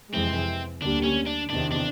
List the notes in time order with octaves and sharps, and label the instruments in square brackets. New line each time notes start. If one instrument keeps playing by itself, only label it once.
[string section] F2 C3 E3 G#3 [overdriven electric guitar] C4
[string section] D2 D3 G3 A#3 [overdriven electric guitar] D4
[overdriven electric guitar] C#4
D4
[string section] E2 C3 D#3 [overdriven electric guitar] D4
[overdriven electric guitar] D4